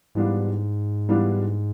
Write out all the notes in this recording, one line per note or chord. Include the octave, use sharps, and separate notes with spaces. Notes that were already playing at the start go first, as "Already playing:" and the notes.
G#2 E3 G3 B3 D4 F4
E3 G3 B3 D4 F4